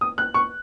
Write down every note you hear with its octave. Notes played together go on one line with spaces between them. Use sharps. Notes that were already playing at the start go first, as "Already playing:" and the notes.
D#6
F#6
C#6